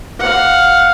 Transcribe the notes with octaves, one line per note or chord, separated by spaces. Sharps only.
F5 F#5